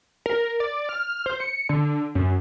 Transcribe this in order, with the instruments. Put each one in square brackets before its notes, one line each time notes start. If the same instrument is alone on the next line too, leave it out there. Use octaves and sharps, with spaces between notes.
[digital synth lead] A#4
D5
F6
C5
C#7
D3
F#2